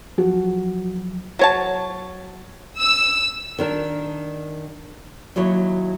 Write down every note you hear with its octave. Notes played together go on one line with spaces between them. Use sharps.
F3 F#3 F#4
F#3 C#5 A5
E6
D#3 D4 A#4
D#2 F#3 E4 C#5